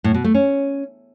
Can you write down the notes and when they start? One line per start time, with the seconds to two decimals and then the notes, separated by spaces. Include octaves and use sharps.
0.04 A2
0.14 B2
0.24 A3
0.34 C#4